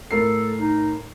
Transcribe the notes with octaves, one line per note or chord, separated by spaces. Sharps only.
A2 A4 A#4 C7
D#4